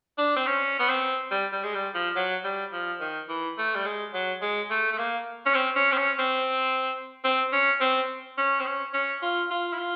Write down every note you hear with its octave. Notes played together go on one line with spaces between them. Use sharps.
D4
C4
C#4
B3
C4
G3
G3
G#3
G3
F3
F#3
G3
F3
D#3
E3
A3
G3
G#3
F#3
G#3
A3
A3
A#3
C#4
C4
C#4
C4
C#4
C4
C4
C#4
C4
C#4
C4
C#4
C#4
F4
F4
E4
F4